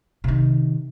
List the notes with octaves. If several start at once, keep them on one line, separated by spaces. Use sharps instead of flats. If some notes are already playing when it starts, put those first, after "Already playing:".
C3 D#3